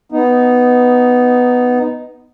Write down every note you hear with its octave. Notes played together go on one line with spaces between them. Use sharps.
B3 D#4